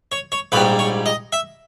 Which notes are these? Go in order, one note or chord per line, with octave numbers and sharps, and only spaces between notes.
C#5
C#5
A#1 G#2 G3 B4
C#5
D#5
E5